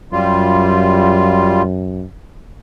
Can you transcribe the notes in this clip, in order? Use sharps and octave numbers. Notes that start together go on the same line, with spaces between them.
F#2 G3 F4